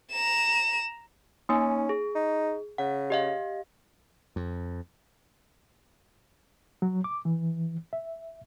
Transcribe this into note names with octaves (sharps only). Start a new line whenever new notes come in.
A#5 E7
A#3 C#4 D#4 G#5
G#4
D#4
C#3 F#5
G4 D#5 F5
F2
F#3
D6
E3
E5